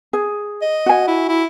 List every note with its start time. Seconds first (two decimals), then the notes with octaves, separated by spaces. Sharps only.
0.13 G#4
0.62 D#5
0.86 F#4 G#5
1.07 E4
1.29 E4